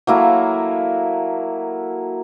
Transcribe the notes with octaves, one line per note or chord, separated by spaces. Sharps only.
F#3 A#3 E4 A4